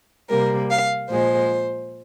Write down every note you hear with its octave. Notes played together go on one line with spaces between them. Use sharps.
C3 G3 A#3 A#4
F5
A#2 F3 G#3 C5